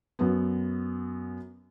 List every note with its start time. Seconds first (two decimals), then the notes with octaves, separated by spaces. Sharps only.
0.19 F#2 B3